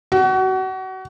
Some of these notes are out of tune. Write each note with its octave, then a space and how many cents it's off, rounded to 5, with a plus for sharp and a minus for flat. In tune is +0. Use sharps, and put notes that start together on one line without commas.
F#4 +30